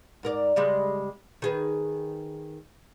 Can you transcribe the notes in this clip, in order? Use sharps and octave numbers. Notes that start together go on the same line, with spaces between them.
G#2 A#4 D5
C#3 G3 G#3
D#3 G#4 B4